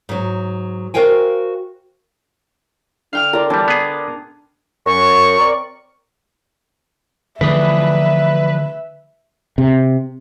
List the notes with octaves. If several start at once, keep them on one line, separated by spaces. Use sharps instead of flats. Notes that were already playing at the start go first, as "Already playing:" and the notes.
G#2 F#3
F#4 A#4 C5 F5 G5 G#5
D3 F5 G5 F6
A#4 D5 C6
E3 G3 D4
B3 G#4
F#2 C#6
C4 A#4 D5
D3 E3 F3 A3 G#4 B4 D5 E5
C3